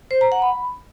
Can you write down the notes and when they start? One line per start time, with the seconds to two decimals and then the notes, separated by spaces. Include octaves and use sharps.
0.11 C5
0.21 A#5
0.32 F#5
0.42 B5